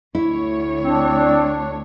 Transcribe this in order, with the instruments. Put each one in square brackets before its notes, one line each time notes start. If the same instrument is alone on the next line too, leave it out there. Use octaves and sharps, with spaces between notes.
[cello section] D2 C#5 [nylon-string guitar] E4
[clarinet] C4 [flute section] D4